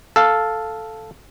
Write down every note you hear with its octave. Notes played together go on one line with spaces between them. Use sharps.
A4 F5